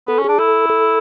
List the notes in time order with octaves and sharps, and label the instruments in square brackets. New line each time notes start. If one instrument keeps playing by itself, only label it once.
[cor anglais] B3 [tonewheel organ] A4
[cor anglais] C#4
[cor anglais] D4 [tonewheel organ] G#4
[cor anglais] E4 [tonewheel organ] A4
[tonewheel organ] A4